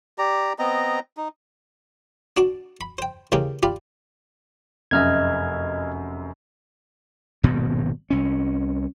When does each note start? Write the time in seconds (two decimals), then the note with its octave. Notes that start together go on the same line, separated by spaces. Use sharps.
0.18 G4 D5 A#5
0.59 B3 C4 D#5 A#5
1.17 D#4
2.37 D4 F#4 A5 D6
2.81 B5
2.98 C5 G5
3.32 E2 C#3 G#3 A#3 G4 G5
3.63 F4 G4 D5 B5
4.91 F1 F#2 D#5 E5 F6 G#6
7.43 D#1 G#1 F#2 B2
8.10 C2 C#4